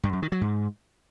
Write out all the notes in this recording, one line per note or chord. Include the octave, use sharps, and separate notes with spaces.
G2
F#2
D#3
F#3
G#2